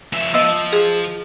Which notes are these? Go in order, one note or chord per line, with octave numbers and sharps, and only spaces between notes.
F3 E5
F3 D#5 E6
G#4